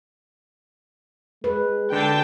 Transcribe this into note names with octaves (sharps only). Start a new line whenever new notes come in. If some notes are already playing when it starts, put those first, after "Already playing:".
G#3 B4
D3 G5 A5